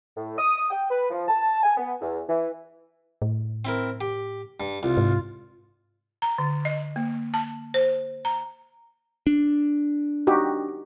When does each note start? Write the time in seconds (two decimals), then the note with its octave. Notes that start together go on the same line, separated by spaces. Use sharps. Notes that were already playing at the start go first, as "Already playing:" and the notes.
0.17 A2
0.38 D#6
0.70 G5
0.90 B4
1.10 F3
1.28 A5
1.63 G#5
1.77 B3
2.01 E2
2.29 E3
3.22 A2
3.65 C4 E4 A#4
4.01 G4
4.60 G2
4.83 C2 F4
4.97 G#2
6.22 A#5
6.38 D3
6.65 D#5
6.96 A#3
7.34 A5
7.74 C5
8.25 A#5
9.27 D4
10.27 D#4 F#4 G4